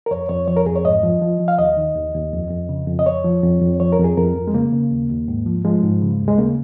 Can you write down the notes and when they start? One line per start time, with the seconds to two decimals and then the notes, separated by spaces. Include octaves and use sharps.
0.06 A#4
0.11 F2 C#5
0.29 F2 C#5
0.48 F3 C#5
0.57 A#4
0.66 F2 G#4
0.76 C#5
0.84 G#2 D#5
1.03 F3
1.22 F3
1.40 F3
1.48 F5
1.58 D#2 D#5
1.77 D#3
1.95 D#2
2.14 D#2
2.33 F2
2.51 F2
2.69 C#3
2.87 F2
2.99 D#5
3.06 F2 C#5
3.25 F3
3.43 F2
3.62 F2
3.80 F3 C#5
3.93 A#4
3.99 F2
4.04 G#4
4.17 F2 A#4
4.36 F2
4.48 G#3
4.54 C#3 A#3
4.73 C#3
4.91 D#2
5.10 D#2
5.28 G#2
5.46 F3
5.65 F3 G#3
5.83 G#2
6.02 C#3
6.21 D#2
6.28 G#3
6.38 C#3 A#3